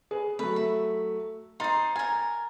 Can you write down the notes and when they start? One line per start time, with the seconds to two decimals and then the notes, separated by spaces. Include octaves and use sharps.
0.11 G#4 B4
0.39 F#3 A3 B4
0.56 E5
1.60 D#4 C5 C6 A6
1.96 A#4 G#5 G#6